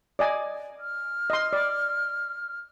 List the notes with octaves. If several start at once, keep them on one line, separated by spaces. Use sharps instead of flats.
D5 D#5 G#5
F6
D#5 C6
D5